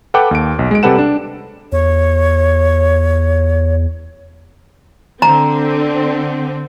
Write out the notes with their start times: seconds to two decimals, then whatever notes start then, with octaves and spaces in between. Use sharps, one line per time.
0.14 A4 B4 F#5 G5 D6
0.31 D#2 D7
0.59 B1
0.71 G#3 D7
0.83 C3 G3 A4 B4 F#5 E7
0.98 D4
1.72 E2 C#5
5.22 D3 C4 A#5